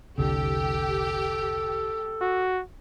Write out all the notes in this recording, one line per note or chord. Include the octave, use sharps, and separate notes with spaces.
F1 C2 D3 G4 A4
F#4